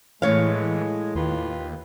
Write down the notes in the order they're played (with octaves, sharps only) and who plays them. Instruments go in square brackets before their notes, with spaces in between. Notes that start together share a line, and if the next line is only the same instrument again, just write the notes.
[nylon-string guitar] A2 C#5 F5 [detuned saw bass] E3 [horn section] G#3
[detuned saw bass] D#2 [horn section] F4 G4 B4